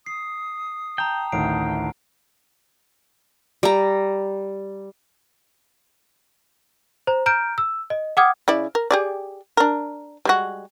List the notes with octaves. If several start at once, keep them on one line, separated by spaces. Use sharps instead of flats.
D#6 C7
G5 A5 A#5
A1 D2 D#3 A#5 C7 D7
G3 A#5
C5 A#5
A#5 F6 G6 D7
E6
D#5
F#5 G5 D6 D#6 F6 G#6
C#3 E4 D5
A#4
G4 G#4 D5
D4 A#4
G3 G#3 F#4